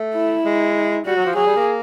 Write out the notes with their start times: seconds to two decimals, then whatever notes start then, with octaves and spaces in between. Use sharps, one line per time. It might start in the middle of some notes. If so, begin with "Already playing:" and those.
Already playing: A3
0.15 E4
0.45 G#3
1.06 G3 F#4
1.16 F#3
1.25 F3
1.36 F#3 G#4
1.46 G3
1.56 A#3